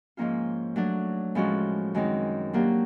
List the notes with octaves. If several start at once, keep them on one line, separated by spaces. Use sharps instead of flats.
G#2 F3 A#3 C#4 F4
F#3 A3 D4
A2 F3 G#3 C#4 F#4
F#2 D#3 G#3 C4 D#4
F#3 A#3 D4 G4